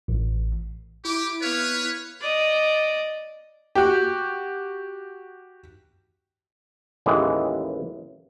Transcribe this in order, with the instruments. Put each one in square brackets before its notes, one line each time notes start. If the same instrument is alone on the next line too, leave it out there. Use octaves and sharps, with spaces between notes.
[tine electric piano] A1
[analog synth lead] E4 [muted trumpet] G4 [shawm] D6
[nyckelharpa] B3 F5 [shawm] B4 [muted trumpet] C#5
[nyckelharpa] D5 D#5
[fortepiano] F#4 G4
[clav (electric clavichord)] A1 D#2 E3 G#3